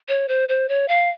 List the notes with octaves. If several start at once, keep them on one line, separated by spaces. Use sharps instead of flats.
C#5
C5
C5
C#5
F5